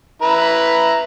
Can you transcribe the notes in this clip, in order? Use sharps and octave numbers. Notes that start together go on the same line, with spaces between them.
E4 B4 A#5